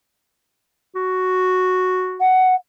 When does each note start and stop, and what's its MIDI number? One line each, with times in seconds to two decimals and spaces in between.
0.96 2.30 66
2.20 2.54 78